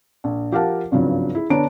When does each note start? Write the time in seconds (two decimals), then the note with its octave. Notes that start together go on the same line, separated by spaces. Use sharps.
0.24 A#1
0.52 F3 G4 A#4 F5 F#5 A5
0.91 G#1 C#2 G2 C#3 F3 F#3
1.35 E4 G#4
1.50 D3 B3 D4 C#5 A#5 D7